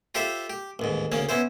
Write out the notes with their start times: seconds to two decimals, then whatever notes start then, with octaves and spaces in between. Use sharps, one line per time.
0.15 F4 G4 A4 C5 E5
0.50 G4
0.79 A1 D#2 G#2
1.12 D2 C#3 A#3 C#4
1.29 B3 C#4 E4 C5